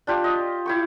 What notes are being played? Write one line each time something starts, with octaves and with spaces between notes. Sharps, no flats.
D4 F4 G4
D#5
E4 G5 C#6